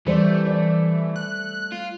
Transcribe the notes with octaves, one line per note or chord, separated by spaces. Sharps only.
E3 G3 A3 C5 D5
D5
F#6
F4